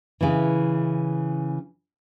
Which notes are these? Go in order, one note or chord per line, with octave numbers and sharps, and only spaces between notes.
C#3 E3